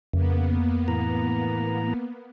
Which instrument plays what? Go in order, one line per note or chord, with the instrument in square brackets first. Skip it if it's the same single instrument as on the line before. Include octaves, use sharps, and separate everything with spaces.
[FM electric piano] F2 [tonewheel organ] C#3 [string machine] A#3 B3
[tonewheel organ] A2 E3 A#5